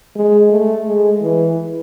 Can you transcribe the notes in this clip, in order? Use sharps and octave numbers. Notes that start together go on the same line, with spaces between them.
G#3
A3
G#3
E3